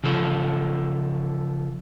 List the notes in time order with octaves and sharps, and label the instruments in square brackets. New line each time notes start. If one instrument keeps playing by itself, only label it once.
[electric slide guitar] C#3 F3 A4